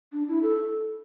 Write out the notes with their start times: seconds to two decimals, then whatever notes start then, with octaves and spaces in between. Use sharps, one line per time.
0.13 D4
0.28 E4
0.43 A4